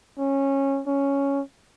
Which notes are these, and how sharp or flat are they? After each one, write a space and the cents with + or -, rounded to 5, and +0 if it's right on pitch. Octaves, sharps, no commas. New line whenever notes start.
C#4 -15
C#4 +5